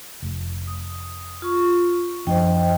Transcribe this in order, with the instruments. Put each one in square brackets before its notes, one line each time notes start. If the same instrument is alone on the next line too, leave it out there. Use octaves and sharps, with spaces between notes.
[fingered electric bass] F1
[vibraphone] D#6
F4 C#6
[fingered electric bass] F#2 F3 D4 [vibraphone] C5 D#5 G5